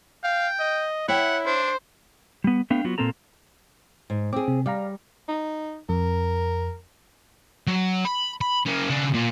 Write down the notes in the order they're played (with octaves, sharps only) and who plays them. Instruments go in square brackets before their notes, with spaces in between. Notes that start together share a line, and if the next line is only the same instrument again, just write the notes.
[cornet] F5 [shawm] G5
[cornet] D#5
[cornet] E4 [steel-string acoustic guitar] C#5 E5 G5 [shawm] F#5
[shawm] D4 [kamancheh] C5
[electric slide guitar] G3 B3
A3 B3 D4 F5 G5
F#3 B3 F4 F#4
A#2 A#3 C4 A4 A#5
[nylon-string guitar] G#2
[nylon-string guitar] C4 G#4 [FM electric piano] D6
[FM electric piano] C3
[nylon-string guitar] G3 [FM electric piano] D5 F5 A#5
[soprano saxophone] D#4
[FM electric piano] F2 [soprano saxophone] A#4
[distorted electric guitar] F#3
B5
B5
A#3 C#4
C#3 D4
A#2